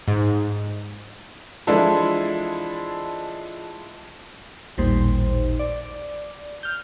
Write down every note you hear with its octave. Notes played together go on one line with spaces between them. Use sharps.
G#2
E3 F3 G#3 D4 E4 A4
A1 D#2 A#2 G3 D#4 C5
D5
F6 G6